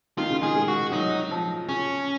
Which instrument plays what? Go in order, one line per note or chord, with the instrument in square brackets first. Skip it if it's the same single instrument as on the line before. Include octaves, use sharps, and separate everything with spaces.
[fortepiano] D#3 [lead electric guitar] F4
[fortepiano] C#3
[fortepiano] D#3 [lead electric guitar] G#4
[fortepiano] G#3
[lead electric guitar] F#4
[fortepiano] F#3 [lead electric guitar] D#4
[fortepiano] F3
[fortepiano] C#3 [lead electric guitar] C#4